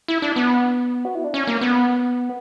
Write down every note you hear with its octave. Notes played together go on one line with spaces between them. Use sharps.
E4
D4
B3
F#4
E4
D4
C#4
A#3
B3